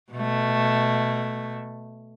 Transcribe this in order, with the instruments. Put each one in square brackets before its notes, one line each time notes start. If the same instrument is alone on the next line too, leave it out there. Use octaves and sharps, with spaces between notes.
[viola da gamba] B2 A3